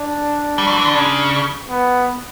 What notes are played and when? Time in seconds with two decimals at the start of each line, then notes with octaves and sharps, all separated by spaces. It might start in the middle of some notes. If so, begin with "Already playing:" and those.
Already playing: D4
0.58 G3
0.67 F#3
0.77 E3
0.85 D3
0.94 C#3 D4
1.70 B3